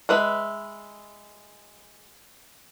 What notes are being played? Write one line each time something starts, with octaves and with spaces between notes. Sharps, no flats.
G#3 B4 E5